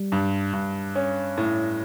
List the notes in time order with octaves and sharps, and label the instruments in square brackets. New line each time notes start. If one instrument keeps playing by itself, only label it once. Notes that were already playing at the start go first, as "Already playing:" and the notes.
Already playing: [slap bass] G3
[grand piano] G2
G2
C#4
A2